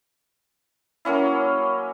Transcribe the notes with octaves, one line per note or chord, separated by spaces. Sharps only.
F#3 A#3 C#4 E4